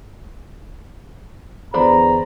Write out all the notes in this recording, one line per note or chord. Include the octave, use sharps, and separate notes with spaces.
E2 D3 C5 D5 A#5 B5